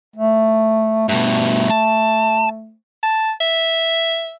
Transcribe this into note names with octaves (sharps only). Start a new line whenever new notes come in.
A3
G2 B2 A3
A5
A5
E5